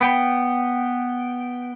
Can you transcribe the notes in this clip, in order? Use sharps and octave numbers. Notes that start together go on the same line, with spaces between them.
B3 G5